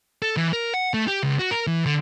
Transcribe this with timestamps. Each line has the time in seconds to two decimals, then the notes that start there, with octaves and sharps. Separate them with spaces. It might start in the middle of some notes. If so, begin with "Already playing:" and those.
0.22 A4
0.37 E3
0.53 A#4
0.74 F#5
0.94 A3
1.08 G4
1.23 C#2
1.39 F#4
1.51 A#4
1.67 E3
1.86 D3